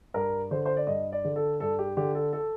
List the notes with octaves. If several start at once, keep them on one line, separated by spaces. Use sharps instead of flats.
G2 A#4
D3 C5
C5
D5
G2 D#5
D5
D3
A4
G2 A4
G4
D3 G4
A4
A4